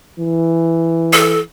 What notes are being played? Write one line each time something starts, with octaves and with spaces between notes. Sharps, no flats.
E3
A4